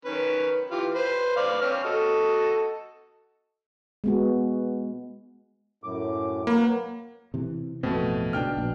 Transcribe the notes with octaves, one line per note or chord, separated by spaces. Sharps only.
D#3 C#4 B4
E3 F4 G4
B4 C5
B4 D5 F5
C4 C#5 F6
F#4 A4 D#5
G#3 B3 F#4
F#2 A2 D6
F#3 A#3 B4
C3 E3
A1 F2 B2 A3 C4
C#2 G#2 B2 D4 G5 F6
A#1 B2